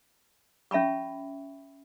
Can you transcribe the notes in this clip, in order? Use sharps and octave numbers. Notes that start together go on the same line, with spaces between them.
C#4 E5 A5 B5 C#6